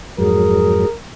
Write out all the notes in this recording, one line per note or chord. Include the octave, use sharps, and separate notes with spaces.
F2 G#2 F#3 G#4 A#4